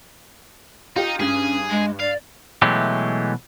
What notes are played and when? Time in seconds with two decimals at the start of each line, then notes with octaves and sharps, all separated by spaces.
0.96 D#4 F4 G4
1.20 G2 C#4 G#4 G#6
1.70 G#3
2.00 D5 F5
2.62 B2 E3 F#3 G#3 A3 G4